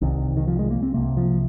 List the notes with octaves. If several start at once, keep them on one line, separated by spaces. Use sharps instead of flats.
C2 C3 D#3
D#3
F3
G#3
A#3
C4
C2 C3 A#3
F3